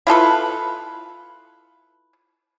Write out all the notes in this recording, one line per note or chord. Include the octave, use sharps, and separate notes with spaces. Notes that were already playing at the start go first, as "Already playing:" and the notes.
E4 F4 A4 B4